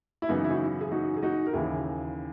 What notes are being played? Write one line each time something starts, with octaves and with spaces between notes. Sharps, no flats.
E4
F#2 C#3 E3 B3 D#4
E4
D#4 F#4
G#4
D#4 F#4
G#4
D#4 F#4
A#4
D#2 C#3 E3 E4 G#4